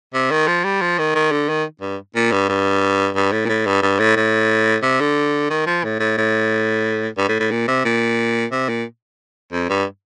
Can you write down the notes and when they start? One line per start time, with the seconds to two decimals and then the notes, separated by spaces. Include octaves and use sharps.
0.14 C3
0.31 D#3
0.47 F3
0.64 G3
0.81 F3
0.98 D#3
1.15 D#3
1.32 D3
1.49 D#3
1.81 G2
2.16 A#2
2.32 G2
2.49 G2
3.16 G2
3.32 A2
3.45 A#2
3.49 A2
3.66 G2
3.82 G2
4.00 A2
4.17 A2
4.83 C3
5.00 D3
5.50 D#3
5.67 F3
5.84 A2
6.00 A2
6.18 A2
7.18 G2
7.28 A2
7.40 A2
7.51 A#2
7.68 C3
7.85 A#2
8.52 C3
8.69 A#2
9.52 F2
9.69 G2